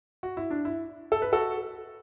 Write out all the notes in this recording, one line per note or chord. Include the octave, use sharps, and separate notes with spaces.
F#4
E4
D4
E4
A4
B4
F#4 A4